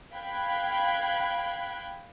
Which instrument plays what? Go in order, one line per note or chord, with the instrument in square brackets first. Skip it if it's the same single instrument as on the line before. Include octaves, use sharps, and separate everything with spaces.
[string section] F5 G5 B5 F#6 G#6